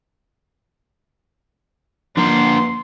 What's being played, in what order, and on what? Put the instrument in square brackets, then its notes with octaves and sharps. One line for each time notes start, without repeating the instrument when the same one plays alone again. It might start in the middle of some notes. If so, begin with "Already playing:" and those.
[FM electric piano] F3 A#3 C7 [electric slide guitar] D4 B4 A#5 [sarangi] C6